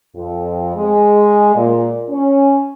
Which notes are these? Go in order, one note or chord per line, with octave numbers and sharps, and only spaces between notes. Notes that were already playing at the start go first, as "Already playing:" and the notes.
F2
G#3
A#2
C#4